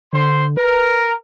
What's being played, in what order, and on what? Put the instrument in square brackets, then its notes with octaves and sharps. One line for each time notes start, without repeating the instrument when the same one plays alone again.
[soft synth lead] D3 [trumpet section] C5 C6
[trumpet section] A#4 [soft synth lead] B4